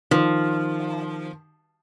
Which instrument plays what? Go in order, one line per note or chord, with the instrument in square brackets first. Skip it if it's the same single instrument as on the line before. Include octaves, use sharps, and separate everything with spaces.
[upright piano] D#3 [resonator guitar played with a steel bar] F3